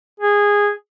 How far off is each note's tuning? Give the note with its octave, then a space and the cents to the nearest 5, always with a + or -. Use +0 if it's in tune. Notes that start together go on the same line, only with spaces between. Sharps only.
G#4 -15